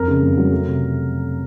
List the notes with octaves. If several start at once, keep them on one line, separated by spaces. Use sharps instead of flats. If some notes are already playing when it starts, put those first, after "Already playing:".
Already playing: F2 A#4
C#3
F2
F#3
A3
C3